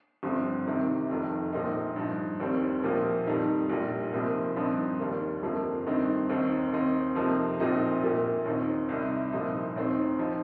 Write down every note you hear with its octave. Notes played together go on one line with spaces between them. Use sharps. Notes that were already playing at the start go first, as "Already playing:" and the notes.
G1 G2 F3 C4
C2 C3 D#3
F1 F2 D#3
A#1 A#2 F3 A#3 D#4
G2 F3 D#4
D#2 D#3 G3 C4
A#1 A#2 F3 A#3
F2 D#3 G3 D#4
A#1 A#2 G3
C2 A#2 F3 A#3 D#4
G2 F3 C4 D#4
D#2 D#3 G3 A#3
G1 F2 F3 A#3
G2 D#3 C4 D#4
D#2 D#3 C4 D#4
D#2 D#3 C4 D#4
F2 C3 F3 A#3 D#4
A#1 A#2 F3 C4 D#4
A#1 A#2 A#3
D#2 D#3 C4 D#4
C2 C3 G3 D#4
C2 A#2 F3 D#4
D#2 D#3 C4 D#4
F3 D#4